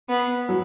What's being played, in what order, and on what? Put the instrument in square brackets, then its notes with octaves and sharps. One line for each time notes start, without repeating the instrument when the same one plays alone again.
[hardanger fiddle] B3
[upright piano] F#3